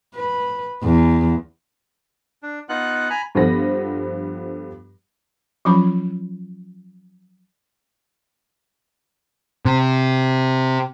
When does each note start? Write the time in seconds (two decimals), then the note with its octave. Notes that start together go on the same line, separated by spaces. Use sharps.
0.14 B4
0.83 E2
2.43 D4
2.69 B3 D#4 F4 F#5 F#6
3.10 G#5 A#5 B5
3.35 G2 F3 B3 A4 B5 A#6
5.65 F3 F#3 C#4 F4 B5
9.65 C3